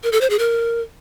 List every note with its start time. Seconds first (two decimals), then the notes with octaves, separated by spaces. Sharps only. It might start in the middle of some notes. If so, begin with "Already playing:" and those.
0.03 A#4
0.12 A4
0.21 C5
0.30 G#4
0.39 A#4